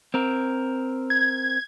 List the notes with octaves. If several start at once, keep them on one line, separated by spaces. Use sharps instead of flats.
C4 A#4
G#6